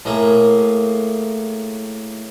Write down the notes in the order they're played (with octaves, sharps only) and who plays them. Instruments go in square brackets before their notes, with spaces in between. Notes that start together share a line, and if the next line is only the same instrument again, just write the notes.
[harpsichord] A2 A#3 G#4